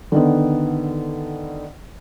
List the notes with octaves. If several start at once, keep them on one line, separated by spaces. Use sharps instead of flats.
D3 D#3 B3